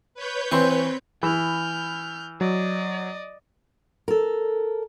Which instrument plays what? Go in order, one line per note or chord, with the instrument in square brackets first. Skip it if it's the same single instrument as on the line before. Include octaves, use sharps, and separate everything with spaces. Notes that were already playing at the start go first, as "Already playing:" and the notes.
[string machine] B4 C#5 G6
[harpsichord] E3 C#6 [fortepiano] C4 C5
[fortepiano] E3 [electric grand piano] B5 [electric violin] F6 G6
[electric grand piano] F#3 [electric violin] D5 D#5
[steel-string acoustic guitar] A4 A#4